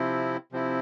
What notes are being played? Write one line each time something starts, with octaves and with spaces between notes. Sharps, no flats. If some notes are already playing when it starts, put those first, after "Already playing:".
Already playing: C3 F3 C4 E4
C3 F3 C4 E4